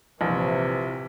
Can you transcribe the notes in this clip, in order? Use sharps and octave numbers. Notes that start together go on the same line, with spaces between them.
A#1 C3 E3